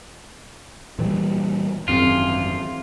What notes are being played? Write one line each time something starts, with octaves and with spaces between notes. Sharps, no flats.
A#2 E3 G3
G#1 F#2 E3 C4 F4 G#4